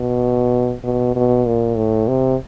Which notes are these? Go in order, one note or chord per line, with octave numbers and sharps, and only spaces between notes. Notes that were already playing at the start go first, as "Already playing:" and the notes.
Already playing: B2
B2
B2
A#2
A2
C3